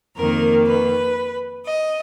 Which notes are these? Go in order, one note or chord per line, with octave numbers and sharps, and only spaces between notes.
F2 D#3 A#3 A#4
B4
D#5